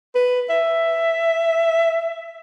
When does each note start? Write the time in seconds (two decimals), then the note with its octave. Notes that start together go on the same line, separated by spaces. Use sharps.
0.15 B4
0.50 E5